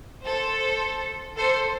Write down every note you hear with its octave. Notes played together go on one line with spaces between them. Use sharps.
A4 C5
A4 C5